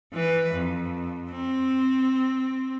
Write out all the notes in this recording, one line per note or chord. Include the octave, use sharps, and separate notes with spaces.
E3 B4
F2
C4